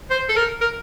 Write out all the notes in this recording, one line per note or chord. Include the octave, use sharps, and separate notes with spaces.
C5
A4
A#4
A#4